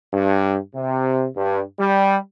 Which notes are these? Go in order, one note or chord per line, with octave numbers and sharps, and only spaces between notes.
G2
C3
G2
G3